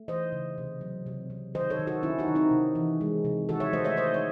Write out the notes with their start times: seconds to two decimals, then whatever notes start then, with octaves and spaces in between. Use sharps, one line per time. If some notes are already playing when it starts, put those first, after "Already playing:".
Already playing: A3
0.08 E3 C5 D#5
0.32 C#3
0.58 C3
0.81 F#3
1.06 C3
1.30 C3
1.55 D#3 C5 D#5
1.70 A4 C#5
1.79 D#3
1.87 F#4 A4
2.03 D#3 C#4 E4
2.19 D#4 F#4
2.28 D#3
2.35 C4 D#4
2.51 C3
2.75 E3
3.01 G#3
3.25 C3
3.49 D#3 F#4 A4
3.60 C#5 E5
3.73 A3 C5 D#5
3.85 C#5 E5
3.97 A3 C5 D#5
4.14 C#5